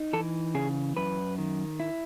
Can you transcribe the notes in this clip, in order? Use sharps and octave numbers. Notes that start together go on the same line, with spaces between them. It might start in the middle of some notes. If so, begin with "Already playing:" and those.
Already playing: D#4
E3 A4
C#3 G#4
F#2 B4
D#3
E4